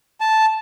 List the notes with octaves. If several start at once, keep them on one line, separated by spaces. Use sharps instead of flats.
A5